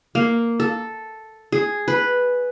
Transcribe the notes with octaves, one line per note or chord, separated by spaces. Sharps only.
A#3
A4
G#4
B4